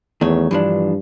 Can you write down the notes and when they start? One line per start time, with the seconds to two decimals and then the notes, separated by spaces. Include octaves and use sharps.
0.21 E2 D#3 A3 C#5
0.51 G2 E3 F3 D4